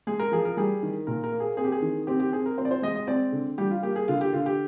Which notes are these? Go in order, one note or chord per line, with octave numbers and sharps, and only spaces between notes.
G#3 G#4
A#4
F3 G#4
A#4
G3 G#4
D#3
A#2 A#4
A#4
A#3
G#4
C4 G#4
G4
G#4
D#3
C4 G4
G4
C4 G#4
A#4
C4 C5
D5
C5
G#3 D#5
D#5
C4 D5
D3
G3 G4
F4
A#3 G4
G#4
D3 F4
G4
D3 F4
G4